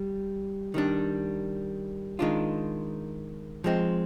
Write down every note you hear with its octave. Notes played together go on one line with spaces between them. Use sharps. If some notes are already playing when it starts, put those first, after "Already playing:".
Already playing: G3
D#3 G3 D4
D#3 G#3 D4 F4
F3 G#3 C4